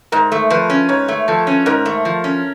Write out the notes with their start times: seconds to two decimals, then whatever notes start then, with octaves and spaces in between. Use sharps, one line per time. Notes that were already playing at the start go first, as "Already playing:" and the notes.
0.12 G#2 A#4
0.32 A3
0.50 F3 B4
0.70 C#4
0.89 G#2 C#5
1.08 A3
1.28 F3 A4
1.47 C#4
1.66 G#2 A#4
1.86 A3
2.05 F3
2.24 C#4